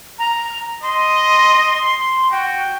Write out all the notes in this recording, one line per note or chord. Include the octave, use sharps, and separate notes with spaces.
A#5
D#5 C6
F#4 G5